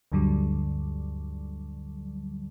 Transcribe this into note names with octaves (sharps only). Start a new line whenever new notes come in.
D2 G2 D3 F#3 G3